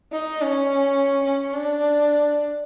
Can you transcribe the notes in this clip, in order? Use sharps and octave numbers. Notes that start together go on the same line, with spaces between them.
D#4
C#4
C#4
D4